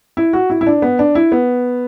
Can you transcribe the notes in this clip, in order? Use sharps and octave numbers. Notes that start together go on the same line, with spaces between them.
E4
F#4
E4
E4
D4
B3
D4
E4
B3